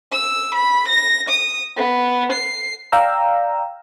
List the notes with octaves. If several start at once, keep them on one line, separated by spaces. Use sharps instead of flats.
E6
B5
A#6
D#6
B3
C7
D5 F5 G5 A#5 E6